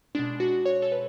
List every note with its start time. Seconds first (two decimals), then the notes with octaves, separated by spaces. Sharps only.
0.15 B2 G#3 D4
0.40 F#4
0.65 C#5
0.82 A4
0.92 B4